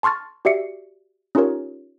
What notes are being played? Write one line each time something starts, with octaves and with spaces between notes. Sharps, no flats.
A5 C6 C#6 F6 A6
F#4 G4 D5 E5 C7 C#7
C#4 D#4 F4 G4 A#4 C#5